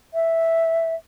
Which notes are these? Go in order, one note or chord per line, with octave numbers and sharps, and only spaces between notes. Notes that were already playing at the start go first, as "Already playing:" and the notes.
E5